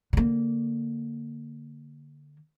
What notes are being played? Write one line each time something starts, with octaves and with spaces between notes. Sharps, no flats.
D3 A#3